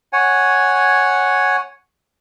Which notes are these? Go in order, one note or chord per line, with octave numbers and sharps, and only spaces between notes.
C#5 F#5 G#5